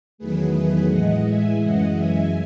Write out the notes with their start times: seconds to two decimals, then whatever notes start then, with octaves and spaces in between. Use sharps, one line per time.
0.18 E2 D#3 F#3 A3 G#4 B4
0.53 G#4 B4
0.88 A2 E3 G#3 D#5 F#5
1.24 E5 G#5
1.59 F#2 C#3 E3 G#3 D#5 F#5
1.93 E5 G#5